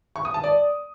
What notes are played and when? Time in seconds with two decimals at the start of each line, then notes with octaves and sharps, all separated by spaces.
0.16 C#6
0.25 D#6
0.34 A5
0.44 D5